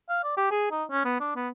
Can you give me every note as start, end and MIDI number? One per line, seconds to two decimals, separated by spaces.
0.09 0.20 77
0.24 0.33 74
0.37 0.51 67
0.51 0.68 68
0.71 0.84 63
0.91 1.04 61
1.05 1.20 59
1.20 1.31 62
1.36 1.49 59